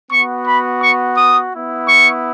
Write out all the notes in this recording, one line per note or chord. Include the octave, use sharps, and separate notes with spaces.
B3 F#4 C#6
B5
C#6
D#6
B3 E4
C#6